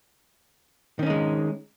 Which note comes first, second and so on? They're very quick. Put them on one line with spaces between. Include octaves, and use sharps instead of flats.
D#3 C#4 D#4 G#3